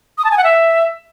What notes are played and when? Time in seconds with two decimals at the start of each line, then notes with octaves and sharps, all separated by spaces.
0.18 D#6
0.24 A5
0.31 G#5
0.37 F#5
0.44 E5